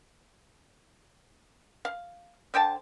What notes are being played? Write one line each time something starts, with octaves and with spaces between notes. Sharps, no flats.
F5
D3 C5 G5 A5